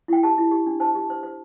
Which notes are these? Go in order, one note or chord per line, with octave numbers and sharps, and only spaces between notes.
E4 G5
G4 A5
E4
G4
D4
C5 A5
G4
C5
C5